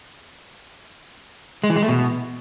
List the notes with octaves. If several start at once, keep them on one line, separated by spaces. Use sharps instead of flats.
G#3
E3
G#3
A3
B2